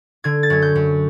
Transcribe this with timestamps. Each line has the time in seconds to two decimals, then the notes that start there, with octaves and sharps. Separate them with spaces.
0.24 D3 G#6
0.43 A6
0.50 F#2 G#6
0.62 G6
0.75 F#2